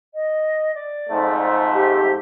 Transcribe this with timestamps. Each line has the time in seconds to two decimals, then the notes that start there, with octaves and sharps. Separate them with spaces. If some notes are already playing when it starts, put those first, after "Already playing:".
0.14 D#5
0.74 D5
1.10 F2 G#2 A3
1.74 G4